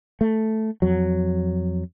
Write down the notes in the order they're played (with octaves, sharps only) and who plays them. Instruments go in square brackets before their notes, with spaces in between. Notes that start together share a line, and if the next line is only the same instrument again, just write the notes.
[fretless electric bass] A3
F2 F#3